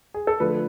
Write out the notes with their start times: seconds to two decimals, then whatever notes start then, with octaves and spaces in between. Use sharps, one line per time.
0.14 G#4
0.27 A4
0.40 D3 F3 A3 B4